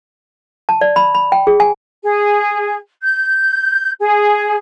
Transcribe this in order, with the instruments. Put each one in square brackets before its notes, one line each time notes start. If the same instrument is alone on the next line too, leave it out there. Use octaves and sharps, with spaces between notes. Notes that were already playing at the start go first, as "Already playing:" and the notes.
[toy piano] A5
D5
B5
B5
G5
G#4
G#5
[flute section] G#4
G6
G#4